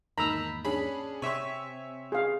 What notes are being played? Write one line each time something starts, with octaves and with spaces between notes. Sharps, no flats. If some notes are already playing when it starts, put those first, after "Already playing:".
E2 G#2 D#3 A#3 A#5 B5 E6
C#4 D4 G#4 B5
C3 C4 C#5 E5 G#5 C#6
G#4 F5